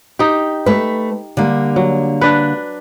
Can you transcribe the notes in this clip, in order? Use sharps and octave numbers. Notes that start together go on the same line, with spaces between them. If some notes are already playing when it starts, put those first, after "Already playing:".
D#4 G4
A3 B4
D3 G3 A#3
F#3
D4 B4